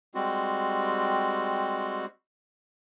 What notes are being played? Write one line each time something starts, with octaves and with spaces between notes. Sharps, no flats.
G3 G#3 C4 F#4